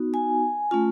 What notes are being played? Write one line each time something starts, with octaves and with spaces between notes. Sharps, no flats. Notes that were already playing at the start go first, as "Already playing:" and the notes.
Already playing: B3 D#4 F#4
G#5
A3 C#4 F4